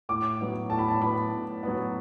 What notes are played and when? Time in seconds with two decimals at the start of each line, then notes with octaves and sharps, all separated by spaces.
0.09 A2 D6
0.40 F#3 B3
0.70 A2 A5
0.79 B5
0.88 A5
1.02 F#3 B3 B5
1.32 A2
1.63 F#3 B3